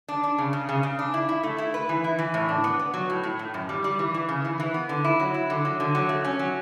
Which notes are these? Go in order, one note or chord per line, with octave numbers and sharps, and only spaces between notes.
D4
D4
C#3
C#3
C#3
C#3
D4
E4
E4
A3
E4
B4
E3
E4
E3
A2
D4
B3
B3
F#3
A2
A2
A2
F#2
G3
G3
E3
E3
C#3
E3
E3
B3
D3
E4
F#3
E4
D3
F#3
D3
F#3
A3
C#4
F#3